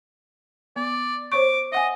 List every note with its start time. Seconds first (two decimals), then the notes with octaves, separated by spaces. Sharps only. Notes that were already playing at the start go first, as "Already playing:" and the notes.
0.76 B3 D5
1.32 C5 C#5 C#6 D6
1.72 D#5 E5 F#5 G#5